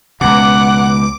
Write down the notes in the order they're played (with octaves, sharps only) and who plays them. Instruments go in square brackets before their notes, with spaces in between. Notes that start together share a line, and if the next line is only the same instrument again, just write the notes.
[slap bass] C#2 B2 [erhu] F#5 [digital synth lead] D6